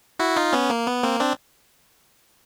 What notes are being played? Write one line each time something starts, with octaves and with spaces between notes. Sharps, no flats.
E4 F#4
D#4 F4
B3 C#4
A#3
B3
A#3 C4
C4 D4